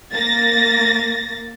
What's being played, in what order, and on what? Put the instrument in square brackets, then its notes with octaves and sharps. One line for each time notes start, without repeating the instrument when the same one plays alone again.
[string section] A#3 A6 A#6